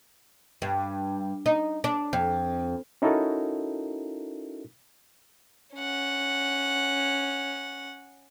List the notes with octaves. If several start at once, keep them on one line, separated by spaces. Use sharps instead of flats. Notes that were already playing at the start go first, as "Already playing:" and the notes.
G2
D#4
D4
F2
C#4 D#4 E4 F#4 A4 A#4
C#4 F#5